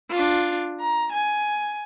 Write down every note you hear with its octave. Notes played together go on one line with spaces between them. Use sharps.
D4 F4
A#5
G#5